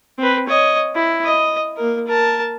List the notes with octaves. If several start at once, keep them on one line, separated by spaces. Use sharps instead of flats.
C4 B4
C#5 D#5
E4
D#5
A#3 A#4
A#4 A5